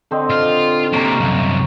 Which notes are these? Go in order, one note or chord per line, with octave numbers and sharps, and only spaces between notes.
D3 C4 D#5
F4
C3 A#3 C#5 A#5
C2 F#2 F5